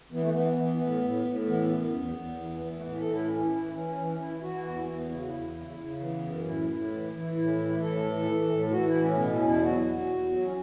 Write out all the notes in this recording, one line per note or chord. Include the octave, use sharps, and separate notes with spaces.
E3 B3
A3
E3 B3
E3
A2
A2
A2
E3 B3
F#2
E2
E2
E3
E3
A3
A2 B3
A4
A2
E4
E3 C#4
E3 E4
E3 C#4
E3
C#4
E3 E4
E3 F#4
E4
E2 F#4
E2 B3
C#3 E4
F#4
E2 E4
C#3
C#3
E3 B3
F#2
A2 E4
A2
E3
E3
A2 E4
E3
A2 A4
E3
E3
A2
E3 F#4
E4
A2
C#4
B2 B3
C#4
E2
E4
F#3 F#4
F#3
E2
F#3
C#4